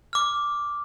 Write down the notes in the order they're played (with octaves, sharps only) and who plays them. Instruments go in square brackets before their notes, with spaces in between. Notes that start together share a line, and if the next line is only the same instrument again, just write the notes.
[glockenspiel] D6 F6